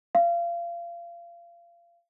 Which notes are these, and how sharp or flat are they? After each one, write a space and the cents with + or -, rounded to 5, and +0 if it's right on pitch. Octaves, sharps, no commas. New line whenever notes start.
F5 -30